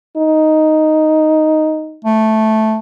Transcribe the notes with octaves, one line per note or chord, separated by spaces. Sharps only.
D#4
A3